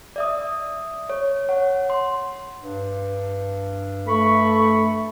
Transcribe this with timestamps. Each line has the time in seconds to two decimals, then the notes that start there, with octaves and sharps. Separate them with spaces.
0.16 D5 E5 D#6
1.10 C#5
1.49 C#5 F#5
1.90 C6
2.59 G2
4.07 A3 B5 C#6